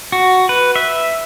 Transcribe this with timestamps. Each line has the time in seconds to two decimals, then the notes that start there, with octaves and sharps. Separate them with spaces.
0.12 F#4
0.49 B4
0.76 E5